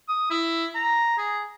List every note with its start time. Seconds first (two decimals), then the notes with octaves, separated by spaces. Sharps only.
0.08 D#6
0.30 E4
0.75 A#5
1.18 G#4